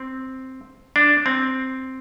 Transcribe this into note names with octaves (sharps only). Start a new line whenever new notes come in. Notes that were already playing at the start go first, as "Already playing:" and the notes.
Already playing: C4
D4
C4